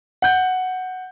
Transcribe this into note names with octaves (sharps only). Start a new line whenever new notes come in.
F#5 G6